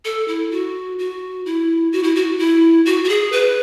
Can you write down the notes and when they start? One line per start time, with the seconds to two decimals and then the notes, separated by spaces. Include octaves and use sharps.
0.05 A4
0.28 E4
0.51 F#4
0.99 F#4
1.46 E4
1.92 F#4
2.03 E4
2.15 F#4
2.39 E4
2.86 F#4
3.04 F#4
3.09 G#4
3.32 B4